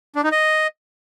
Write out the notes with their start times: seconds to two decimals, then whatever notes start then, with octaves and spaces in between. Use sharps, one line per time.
0.15 D4
0.24 D#4
0.32 D#5